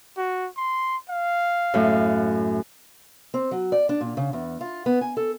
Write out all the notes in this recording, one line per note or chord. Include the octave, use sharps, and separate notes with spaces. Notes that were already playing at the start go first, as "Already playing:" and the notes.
F#4
C6
F5
F#2 A2
C4
F#3
D5
D4
A#2
C#3
E2
F4
B3
G#5
A4